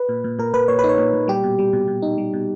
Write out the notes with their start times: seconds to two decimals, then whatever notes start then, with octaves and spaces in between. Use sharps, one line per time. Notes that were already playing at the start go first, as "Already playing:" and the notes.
Already playing: B4
0.09 A#2
0.24 A#2
0.39 A#2 A#4
0.53 A#2 B4
0.68 A#2 C#5
0.79 B4
0.84 D#4
0.89 C#5
0.98 A#2
1.14 A#2
1.28 G3 G4
1.44 B2
1.59 G3
1.73 B2
1.88 B2
2.02 D#4
2.18 G3
2.33 B2